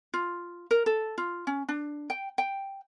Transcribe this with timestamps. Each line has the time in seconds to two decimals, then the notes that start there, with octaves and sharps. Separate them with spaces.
0.14 F4
0.71 A#4
0.86 A4
1.18 F4
1.47 C#4
1.68 D4
2.10 G5
2.38 G5